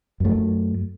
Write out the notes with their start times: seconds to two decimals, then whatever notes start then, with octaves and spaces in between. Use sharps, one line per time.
0.20 F#2
0.25 A3
0.29 F#3